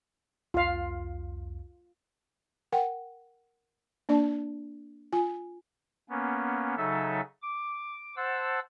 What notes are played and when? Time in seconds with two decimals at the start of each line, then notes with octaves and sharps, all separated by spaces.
0.54 C2 F2 F4 F5
2.72 A#4 F#5 G5
4.09 A#3 D4 D5 A5
5.13 F4 G#5
6.10 A#3 B3 C#4
6.77 C#3 F#3 D#4 A4 E5
7.42 D6
8.17 C5 F#5 A5 E6